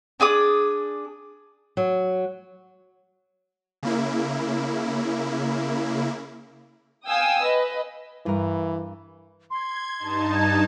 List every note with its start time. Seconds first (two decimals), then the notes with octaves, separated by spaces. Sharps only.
0.20 D4 G#4 D6 D#6
1.77 F#3
3.83 C#3 A#3 E4
7.07 F5 G5 G#5 D#6 E6
7.44 B4 D#5
8.26 G2 E3 A#4
9.51 C6 G#6
9.99 G2 D#4 A5
10.35 G#6